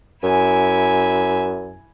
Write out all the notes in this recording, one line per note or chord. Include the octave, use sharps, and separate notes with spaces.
F#2 E4 G#5